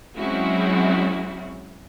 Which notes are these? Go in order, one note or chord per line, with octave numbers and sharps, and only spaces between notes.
F#3 G#3 C4 C#4 E4 F#4